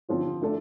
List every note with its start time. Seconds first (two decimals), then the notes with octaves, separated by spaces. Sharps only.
0.09 D3 F3 C4 F4
0.42 A3 D4 A4